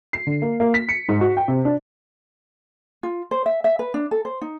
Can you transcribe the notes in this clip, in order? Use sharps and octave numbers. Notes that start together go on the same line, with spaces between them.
C7
D3
A#3
A#3
B6
C#7
G#2
F#4
G5
C3
D4
F4
C5
E5
E5
B4
D4
A4
C5
D#4